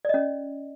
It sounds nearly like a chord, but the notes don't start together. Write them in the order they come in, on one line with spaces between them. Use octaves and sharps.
D5 D#5 C#4